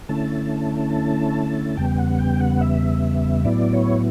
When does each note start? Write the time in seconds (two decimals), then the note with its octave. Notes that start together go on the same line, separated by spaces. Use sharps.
0.09 D3 A3 C#4 E4 A5
1.77 E2 C#3 G3 B3 G5
1.98 F#5
2.19 G5
2.40 F#5
2.61 E5
3.45 A2 F#3 B3 E4 D5
3.73 C#5